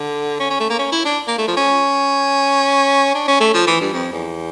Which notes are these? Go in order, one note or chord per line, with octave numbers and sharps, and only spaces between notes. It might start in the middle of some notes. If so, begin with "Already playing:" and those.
Already playing: D3
C#4
C#4
A3
A#3
C#4
E4
D4
A#3
A3
F3
C#4
D4
C#4
A3
F3
E3
G2
F2
E2